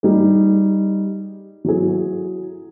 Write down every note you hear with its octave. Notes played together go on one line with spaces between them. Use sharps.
G3 D#4 G#4
F#3 E4 G#4